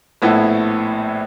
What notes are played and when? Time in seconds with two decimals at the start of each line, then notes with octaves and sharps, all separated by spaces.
0.22 A#1 A2 B3 E4 A4